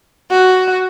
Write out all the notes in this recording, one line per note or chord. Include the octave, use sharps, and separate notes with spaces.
F#4